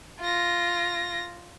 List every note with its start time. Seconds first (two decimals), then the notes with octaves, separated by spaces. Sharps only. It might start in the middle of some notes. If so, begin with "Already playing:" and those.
0.20 F4 A#6